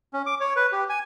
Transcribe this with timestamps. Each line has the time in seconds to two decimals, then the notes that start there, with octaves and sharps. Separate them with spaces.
0.14 C#4
0.26 D6
0.40 C#5
0.56 B4
0.72 G4
0.90 G#5